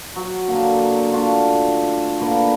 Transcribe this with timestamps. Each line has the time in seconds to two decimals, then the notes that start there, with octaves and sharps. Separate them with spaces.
0.16 F#3
0.48 D3 A#3
1.11 A3 D4 F4 F#4
2.21 D3 A#3 B4 D6